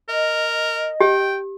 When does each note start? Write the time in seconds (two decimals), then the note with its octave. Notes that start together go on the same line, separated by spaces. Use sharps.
0.09 A#4 D#5
1.01 G4 G5